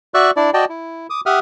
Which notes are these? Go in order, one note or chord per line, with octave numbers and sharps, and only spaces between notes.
F#4 D5 E5 C#6 E6 F#6
D4 E4 D5
F#4 D5 D#5 G5 A5
E4
D6 D#6
G4 E5 F#5 D#6 F6